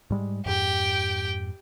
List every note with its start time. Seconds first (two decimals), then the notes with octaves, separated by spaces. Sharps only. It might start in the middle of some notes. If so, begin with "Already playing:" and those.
0.10 G#2 G3 G#3
0.46 F2 G#2 G4 G5